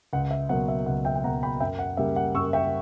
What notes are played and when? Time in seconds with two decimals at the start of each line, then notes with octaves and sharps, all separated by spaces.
0.13 C#2 F#5
0.31 E5
0.49 B2 F#3 A#3 F#5
0.68 E5
0.86 C#2 F#5
1.05 E5 G5
1.15 G5
1.24 B2 F#3 A#3 F#5 A#5
1.43 G5 B5
1.60 F#2 E5 G5
1.79 F#5
1.97 C#3 G3 A#3 E5
2.16 F#5
2.35 F#2 C#6 E6
2.53 E5 G5